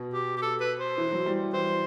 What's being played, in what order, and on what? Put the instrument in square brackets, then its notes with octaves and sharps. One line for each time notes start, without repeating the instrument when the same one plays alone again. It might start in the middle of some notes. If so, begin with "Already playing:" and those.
Already playing: [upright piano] B2
[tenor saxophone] G4
G4
A4
B4
C5
[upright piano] E3
E3
F#3
G3
[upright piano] E3 [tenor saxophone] C5